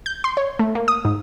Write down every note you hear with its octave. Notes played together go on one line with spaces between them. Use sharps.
G6
C6
C#5
A3
A#3
D#6
G#2